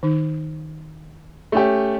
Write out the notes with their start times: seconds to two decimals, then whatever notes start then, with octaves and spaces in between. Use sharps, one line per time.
0.03 D#3 D#4
1.52 A3 C#4 G4